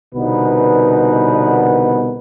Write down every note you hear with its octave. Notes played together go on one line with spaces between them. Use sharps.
C2 B2 D3 B3 D#4 B4